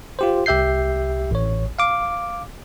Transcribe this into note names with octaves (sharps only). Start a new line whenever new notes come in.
F4 G4 C5
C2 G4 E5 G6 C7
A1 C#5
F5 D6